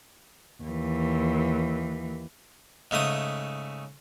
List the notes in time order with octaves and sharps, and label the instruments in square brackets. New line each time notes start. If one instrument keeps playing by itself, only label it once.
[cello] D#2 E3
[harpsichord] G#2 C#3 A3 D#6